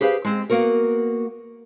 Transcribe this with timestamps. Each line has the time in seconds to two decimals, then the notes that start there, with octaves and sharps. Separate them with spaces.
0.01 G4 G#4 B4 C5 F5
0.25 G#3 C4
0.50 A#3 B3 F#4 A#4